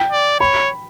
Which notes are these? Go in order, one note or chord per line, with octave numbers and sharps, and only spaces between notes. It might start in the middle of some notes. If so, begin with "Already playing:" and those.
Already playing: G5
D5
C#5 B5